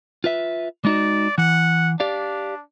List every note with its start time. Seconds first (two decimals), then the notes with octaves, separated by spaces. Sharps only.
0.24 F4 B4 E5
0.85 G#3 D#4 F#4 D5
1.38 E3 F#5
2.00 D4 G4 D5 F5